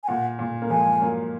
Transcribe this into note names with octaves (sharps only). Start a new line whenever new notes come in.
G#5
A#2 F#5
A#2
A#3
F3 G#3 G#5
F#3 A#3